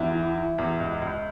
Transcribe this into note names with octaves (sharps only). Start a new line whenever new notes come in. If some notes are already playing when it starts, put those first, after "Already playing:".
Already playing: E2 E4
E3
E3
E2
C#2
C#2